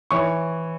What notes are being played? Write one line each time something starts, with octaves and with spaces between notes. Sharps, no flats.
E3 C#5 C#6